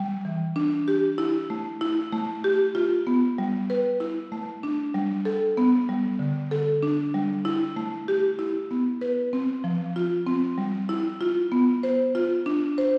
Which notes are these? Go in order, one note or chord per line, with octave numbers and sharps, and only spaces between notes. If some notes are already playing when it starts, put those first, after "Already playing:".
Already playing: G3
E3
D4
G4
E4
A3
E4
A3
G4
F4
B3
G3
B4
E4
A3
D4
G3
A4
B3
G3
D3
A4
D4
G3
E4
A3
G4
E4
B3
B4
C4
F3
F4
C4
G3
E4
F4
B3
C5
F4
D4
C5